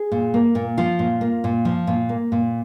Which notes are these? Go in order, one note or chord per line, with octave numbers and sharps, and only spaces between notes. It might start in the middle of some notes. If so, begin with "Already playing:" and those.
Already playing: G#4
A#2
A#3
A#2
F3 F4
A#2
A#3
A#2
F3
A#2
A#3
A#2